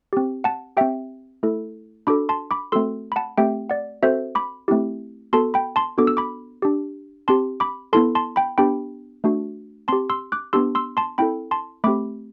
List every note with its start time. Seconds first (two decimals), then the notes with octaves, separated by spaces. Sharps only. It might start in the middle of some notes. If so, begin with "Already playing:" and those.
0.13 C4 G4
0.44 F#5 A5
0.77 C4 G4 E5 G5
1.43 A3 E4 A4
2.07 D4 F#4 A4 B5 D6
2.29 A5 C6
2.51 B5 D6
2.72 A3 C4 F#4 A4 C6 E6
3.12 B5
3.16 F#5 A5
3.38 A3 C4 G4 E5 G5
3.70 D5 F#5
4.03 C4 F#4 A4 C5 E5
4.35 B5 D6
4.68 A3 C4 E4 G4
5.33 B3 F#4 A4 A5 C6
5.54 G5 B5
5.76 A5 C6
5.98 B3 D4 F#4 A4 D6
6.07 E6
6.17 B5 D6
6.62 D4 G4
7.28 C4 G4 A5 C6
7.60 B5 D6
7.93 B3 E4 A4 A5 C6
8.15 A5 C6
8.36 G5 B5
8.58 B3 D4 G4 G5 B5
9.24 A3 D4 F#4
9.88 C4 G4 A5 C6
10.10 C6 E6
10.32 D6 F#6
10.53 B3 D4 G4 C6 E6
10.75 C6 E6
10.97 A5 C6
11.18 C4 E4 A4 G5 B5
11.51 A5 C6
11.84 A3 C4 G4 B5 D6